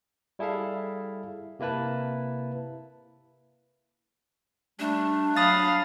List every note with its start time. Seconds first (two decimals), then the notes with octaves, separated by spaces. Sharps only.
0.39 G3 E4 G#4 A4 E5 F5
1.59 C3 A#3 E4 B4 A5
4.79 G3 A3 D4
5.37 F#3 F5 B5 D#6 A6